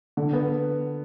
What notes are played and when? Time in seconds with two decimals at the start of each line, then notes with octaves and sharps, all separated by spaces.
0.17 D3
0.33 B3